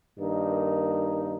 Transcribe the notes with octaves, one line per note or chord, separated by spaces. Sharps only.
G2 D#3 A#3 D#4